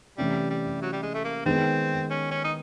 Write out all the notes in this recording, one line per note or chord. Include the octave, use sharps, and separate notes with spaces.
C3 E3 G3 A3 C#4 E4
G3
F#3
G3
G#3
A3
A#3
D#3 G#3 B3 C4
C#4
C#4
D#4